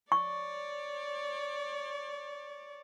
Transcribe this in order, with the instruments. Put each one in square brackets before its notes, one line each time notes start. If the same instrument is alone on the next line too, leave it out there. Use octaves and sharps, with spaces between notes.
[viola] C#5 D5 [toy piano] C#6